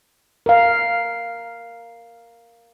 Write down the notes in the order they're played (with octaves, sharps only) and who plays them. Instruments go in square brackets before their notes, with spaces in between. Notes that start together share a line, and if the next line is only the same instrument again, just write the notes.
[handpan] A#4 F5